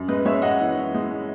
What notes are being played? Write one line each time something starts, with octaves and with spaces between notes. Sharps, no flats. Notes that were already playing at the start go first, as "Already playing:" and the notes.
Already playing: F#2
G#3 B4 D#5
G#3 C#5 E5
F#2 D#5 F#5
E3
E3
G#3